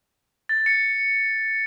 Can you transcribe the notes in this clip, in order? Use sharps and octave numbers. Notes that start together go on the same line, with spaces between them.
A6
C#7